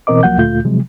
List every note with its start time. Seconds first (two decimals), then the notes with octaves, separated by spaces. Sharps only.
0.07 B2 E3 C4 A#4 D#5 D6
0.23 C2 F3 F#3 A#3 F#5 G6
0.38 D2 A#2 A3 F4 G6
0.65 C3 F3 F#3 G#3